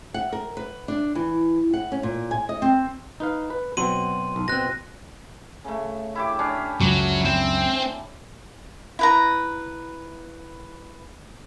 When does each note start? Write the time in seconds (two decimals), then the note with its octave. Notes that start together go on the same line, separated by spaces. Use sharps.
0.14 F#5
0.32 A#4
0.57 B4
0.88 D4
1.15 E3
1.73 F#5
1.92 C#4
2.03 A#2
2.31 G#5
2.49 D#5
2.62 C4
3.20 D#4 B4 F5
3.50 B4
3.77 B2 F#3 C4 C6 D#7
4.36 B1
4.48 B2 C4 F#6 A#6
5.64 C#3 A3
6.15 E4 G4 D6
6.39 C#4 D4
6.81 C#2 F#2 F#3
7.25 C4
8.99 E4 B4 A#5